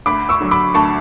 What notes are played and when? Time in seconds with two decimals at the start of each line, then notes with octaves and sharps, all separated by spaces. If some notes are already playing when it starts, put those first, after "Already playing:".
0.06 D2 B5 D6
0.29 C#6 E6
0.41 D3 F#3
0.51 B5 D6
0.74 D2 A5 C#6